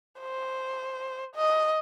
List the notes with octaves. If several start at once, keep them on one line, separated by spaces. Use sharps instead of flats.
C5
D#5